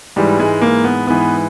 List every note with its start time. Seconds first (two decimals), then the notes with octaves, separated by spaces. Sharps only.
0.16 G#2 E3 G3
0.40 G#3
0.61 A#3
0.84 B3
1.07 G#2 E3 B3